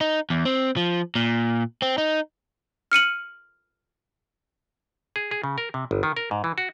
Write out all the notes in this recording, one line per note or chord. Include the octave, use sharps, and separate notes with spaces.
D#4
E2
C4
F3
A#2
C4
D#4
F6 C#7 D#7 F#7
G#4
G#4
C#3
A#4
C3
G1
D#3
A#4
G#2
E3
F#4